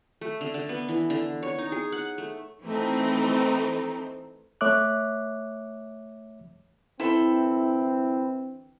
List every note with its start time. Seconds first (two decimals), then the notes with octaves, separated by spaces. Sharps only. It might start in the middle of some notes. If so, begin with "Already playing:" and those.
0.21 A3
0.41 D3
0.54 D3
0.69 B3
0.89 E3
1.10 D3
1.43 C#5
1.58 D#4
1.72 G#4
1.92 F#5
2.18 A3
2.64 E3 A3 C4 D#4
4.61 A3 C#5 E5 D6 F#6
7.00 D3 E3 C4 E4 A4 C5